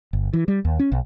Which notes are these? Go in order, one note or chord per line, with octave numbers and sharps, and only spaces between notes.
G1
E3
G3
D#2
C#4
B1